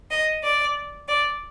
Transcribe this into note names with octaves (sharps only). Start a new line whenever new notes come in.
D#5
D5
D5